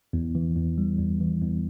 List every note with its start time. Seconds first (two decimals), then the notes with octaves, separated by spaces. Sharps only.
0.13 E2
0.35 E3
0.56 E2
0.78 G3
0.99 E2
1.21 E3
1.42 E2